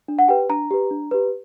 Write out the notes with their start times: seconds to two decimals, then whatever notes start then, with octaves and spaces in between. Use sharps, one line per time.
0.08 D4
0.19 F#5
0.28 G4 B4 G5
0.50 D4 A#5
0.71 G4 B4
0.91 D4
1.11 G4 B4